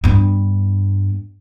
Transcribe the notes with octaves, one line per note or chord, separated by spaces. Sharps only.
G2 B3